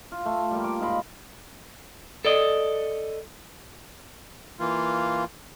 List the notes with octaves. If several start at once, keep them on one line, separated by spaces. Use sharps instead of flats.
F4
A3
G3 A#3
D6
G#2 F4 D#5 B5
A4 D5 D#5
E3 A#3 F4